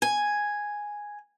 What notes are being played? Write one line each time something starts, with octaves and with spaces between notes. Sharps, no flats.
G#5